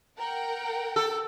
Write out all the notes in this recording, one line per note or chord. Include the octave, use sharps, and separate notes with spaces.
A#4 F#5 G5
A4